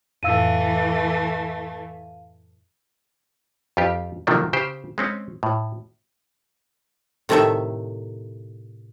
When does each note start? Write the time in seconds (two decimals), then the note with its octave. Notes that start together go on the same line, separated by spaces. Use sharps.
0.23 F2 A2 E3 A3 F5 E6 D#7
3.77 F2 F4 G4
4.27 C3 D#3 F3 F#3 A3 A#3
4.53 C#3 G4 C5 G5
4.98 G#3 C4 C#4
5.43 A2
7.29 A2 C3 D#3 A3 A4 E5